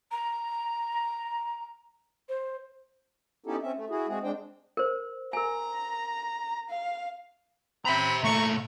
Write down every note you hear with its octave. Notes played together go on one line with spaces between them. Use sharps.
A#5
C5
B3 C#4 D#4 E4 G4 A4
C4 C#4 E5
A3
E4 F#4 G#4
G#3 C4 F#4 G#4
G#3 C4 D4 C5 G5
A#4 C5
A#4 G#5 A#5
F5
C4 E5 A#5 B5
A#2 A3 A#5 C#6